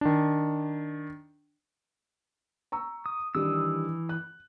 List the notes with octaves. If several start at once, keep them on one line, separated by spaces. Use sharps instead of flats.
D#3 D4
A#5 C#6 E6
D#6
D#3 E3 G3 D4 D#6 E6
F#6